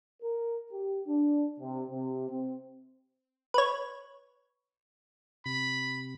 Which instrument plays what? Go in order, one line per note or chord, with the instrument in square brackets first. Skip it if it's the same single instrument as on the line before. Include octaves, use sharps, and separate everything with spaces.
[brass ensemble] A#4
G4
D4
C3
C3
C4
[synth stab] B4 C#5
[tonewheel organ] C3 [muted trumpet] B5